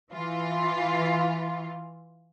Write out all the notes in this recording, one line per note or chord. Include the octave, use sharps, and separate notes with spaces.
E3 F4